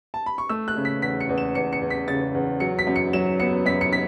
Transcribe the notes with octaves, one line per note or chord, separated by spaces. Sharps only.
A5
B5
C#6
A3 E6
F#6
C#3
B6
E2 B6
C#7
E2
E7
E2 C#7
C#7
E2
B6
C#3 A6
E2
F#3 C#7
B6
F#2
C#7
F#3 E7
B3 C#7
F#2 B6
C#7
B6